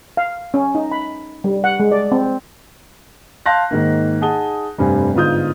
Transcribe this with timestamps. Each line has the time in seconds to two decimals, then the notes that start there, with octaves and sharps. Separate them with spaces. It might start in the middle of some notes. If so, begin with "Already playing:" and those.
0.17 F5
0.54 C#4
0.75 D#4
0.92 B5
1.44 G3
1.64 F#5
1.80 G#3
1.92 D5
2.12 C4
3.46 F5 A5 C6 F#6 G6 A#6
3.71 G#2 D#3 A#3
4.21 D#4 G#4 F#5 A5 D#6 G7
4.78 F1 G2 G3 C4 G#5
5.15 G1 G#2 F4 D#6 G6